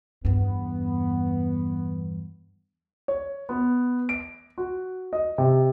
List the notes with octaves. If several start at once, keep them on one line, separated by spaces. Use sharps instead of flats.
E2 G2 B3
C#5
B3
D7
F#4
D#5
C3